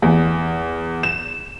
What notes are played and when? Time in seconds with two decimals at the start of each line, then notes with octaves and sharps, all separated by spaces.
0.02 E2
1.03 E7